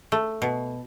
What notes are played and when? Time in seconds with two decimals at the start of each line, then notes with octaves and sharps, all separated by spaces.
0.12 A3
0.42 B2